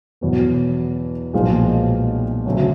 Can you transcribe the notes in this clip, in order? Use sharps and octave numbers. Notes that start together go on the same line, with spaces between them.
E2 B2 F#3 B3
B1 A#2 F3 G#3
D2 C#3 F#3